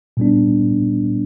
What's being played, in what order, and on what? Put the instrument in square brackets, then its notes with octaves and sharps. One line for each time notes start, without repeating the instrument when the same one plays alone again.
[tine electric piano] A#2 G3 B3 D4